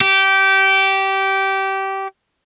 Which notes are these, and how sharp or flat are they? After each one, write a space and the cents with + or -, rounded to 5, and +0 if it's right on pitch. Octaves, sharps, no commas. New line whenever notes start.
G4 -20